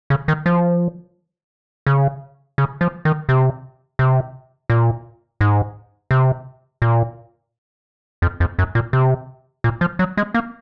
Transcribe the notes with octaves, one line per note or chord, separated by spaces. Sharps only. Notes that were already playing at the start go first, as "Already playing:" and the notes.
C#3
D#3
F3
C#3
C#3
F3
D#3
C3
C3
A#2
G#2
C3
A#2
F2
F2
F#2
A#2
C3
A#2
F3
F#3
G#3
A#3